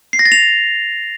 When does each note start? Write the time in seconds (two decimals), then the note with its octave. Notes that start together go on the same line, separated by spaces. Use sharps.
0.13 C7
0.19 A#6
0.25 A6
0.32 F7